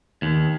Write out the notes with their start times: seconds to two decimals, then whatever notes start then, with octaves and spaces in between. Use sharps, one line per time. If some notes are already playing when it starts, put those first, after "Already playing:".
0.22 D#2